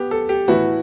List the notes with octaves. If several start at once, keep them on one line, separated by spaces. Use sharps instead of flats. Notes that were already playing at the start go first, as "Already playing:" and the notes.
Already playing: B3 G4
A4
G4
A2 E3 B3 E4 F#4